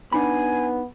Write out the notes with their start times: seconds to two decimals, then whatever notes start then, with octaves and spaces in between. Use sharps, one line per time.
0.13 B3 D4 D#4 G#5 B5